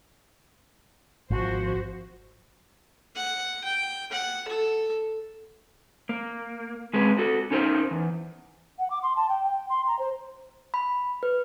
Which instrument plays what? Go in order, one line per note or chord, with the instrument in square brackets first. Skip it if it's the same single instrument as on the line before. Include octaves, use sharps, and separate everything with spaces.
[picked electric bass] G#1 [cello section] F3 F#4 C5
[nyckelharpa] F#5
G5
F#5
A4
[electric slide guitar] A#3
G#3 C4 G#4 B4
F#4 A4
C#4 D#4 A#4 C5
E2
[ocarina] F#5
D6
C6
A5
G5
G5
C6
A#5
C5
[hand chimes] B5
B4